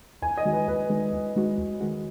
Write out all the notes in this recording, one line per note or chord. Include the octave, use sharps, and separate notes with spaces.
D#2 G#5
D#5
D#3 G#3 D#4 F#4
B4
D#2 B4
D#3 G#3 D#4 F#4
D#2
D#3 G#3 D#4 F#4
D#2
D#3 G#3 D#4 F#4